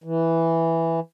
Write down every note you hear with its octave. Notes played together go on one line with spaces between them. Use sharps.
E3